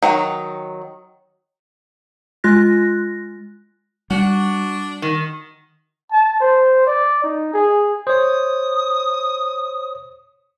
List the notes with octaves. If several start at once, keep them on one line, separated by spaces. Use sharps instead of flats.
D#3 F#3
G#3 F4 F#6 A#6
G3 D4 F#4
D#3
A5
C5
D5
D#4
G#4
C5 C#5 D#6